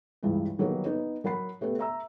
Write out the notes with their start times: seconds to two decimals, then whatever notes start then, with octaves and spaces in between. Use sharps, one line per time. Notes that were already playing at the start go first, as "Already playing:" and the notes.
0.23 C#2 G2 E3 G3 G#3
0.58 D#3 F#3 G3 A#3 B3 D#4
0.85 B3 D#4
1.24 F#3 A#4 F#5 B5 C7
1.61 A3 B3 G4 A4
1.79 E5 A#5 E6